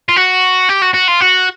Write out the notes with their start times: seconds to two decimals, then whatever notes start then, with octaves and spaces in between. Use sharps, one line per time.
0.09 F4
0.16 F#4
0.69 G4
0.82 F#4
0.94 F#4
1.08 F4
1.21 F#4